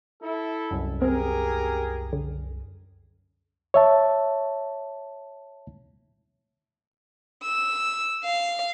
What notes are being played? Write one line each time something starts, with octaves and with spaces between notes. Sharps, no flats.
E4 A4
C2 F#2
C4 G4 G#4 A#4
D3
C#5 E5 A5
E6
F5